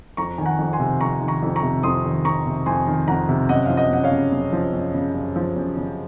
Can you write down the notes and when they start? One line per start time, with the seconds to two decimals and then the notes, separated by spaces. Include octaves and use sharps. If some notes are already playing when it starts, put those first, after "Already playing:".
0.17 F2 A#5 C#6
0.38 D#3 G#5
0.46 F#5 A#5
0.59 F2
0.73 G#5 C6
0.80 C3
1.00 F2 A#5 C#6
1.21 D#3
1.28 A#5 C#6
1.42 F2
1.56 A#5 C#6
1.63 C3
1.83 F2 C6 D#6
2.04 D#3
2.25 F2 A#5 C#6
2.45 C3
2.66 F2 G#5 C6
2.87 D#3
3.07 F2 F#5 A#5
3.29 C3
3.49 F#2 D#5 F#5
3.66 F3 F5
3.77 D#5 F#5
3.91 F#2 F#5
4.04 C#5 F5
4.11 C#3
4.32 F#2
4.53 F3
4.73 F#2
4.94 C#3
5.14 F#2
5.36 F3
5.56 F#2
5.77 C#3